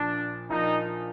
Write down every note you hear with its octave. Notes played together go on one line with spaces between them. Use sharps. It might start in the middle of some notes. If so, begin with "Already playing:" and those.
Already playing: A#1 A#2 F3 D4
A#1 A#2 F3 A#3 D#4